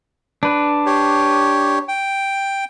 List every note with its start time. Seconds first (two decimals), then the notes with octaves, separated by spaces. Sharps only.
0.43 D4 B4
0.86 G4 C#5
1.88 G5